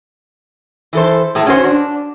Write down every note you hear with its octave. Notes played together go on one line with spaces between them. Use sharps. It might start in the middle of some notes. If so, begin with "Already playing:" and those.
E3 A4 C5
A2 G#4 A5
C#4 F#4 C5
D4